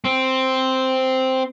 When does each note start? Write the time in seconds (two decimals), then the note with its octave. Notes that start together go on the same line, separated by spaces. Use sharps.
0.05 C4